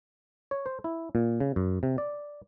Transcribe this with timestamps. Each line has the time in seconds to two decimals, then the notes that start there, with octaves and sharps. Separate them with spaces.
0.51 C#5
0.66 C5
0.84 E4
1.15 A#2
1.40 C#3
1.56 F#2
1.83 C3
1.98 D5